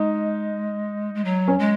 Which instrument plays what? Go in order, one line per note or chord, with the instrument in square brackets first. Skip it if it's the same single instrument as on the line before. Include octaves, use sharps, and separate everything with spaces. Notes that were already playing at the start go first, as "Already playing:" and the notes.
Already playing: [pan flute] G#3 [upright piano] D#4
[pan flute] G#3
F#3
[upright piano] C#4
[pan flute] G#3